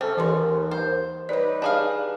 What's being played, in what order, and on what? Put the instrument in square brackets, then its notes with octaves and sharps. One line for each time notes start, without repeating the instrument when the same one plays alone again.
[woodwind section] C3 A4 [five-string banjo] C#4 [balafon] C5
[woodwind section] D#2 [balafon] E3 B4 C6
[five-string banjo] C5
[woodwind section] G3 D#4 B4 [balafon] C#5 D5
[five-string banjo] D4 G#4 F5